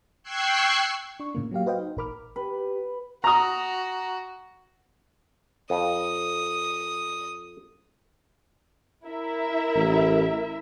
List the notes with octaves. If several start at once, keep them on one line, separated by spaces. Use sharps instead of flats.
G5 C#6 E6 F#6 G#6 C7
D4 C#6
A2 C#3 A#3
F#3 A#3 G4 F5
F#4 B4 C5 D#5 F5 G5
D#4
A1 A#2 A#4 B5 D6 F6
G4 B4
F#4 A#5 D#6
F2 D#6
E4 A#4 E5
A1